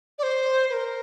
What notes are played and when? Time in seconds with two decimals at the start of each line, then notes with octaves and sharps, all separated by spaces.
0.18 D5
0.23 C5
0.70 B4
0.73 A#4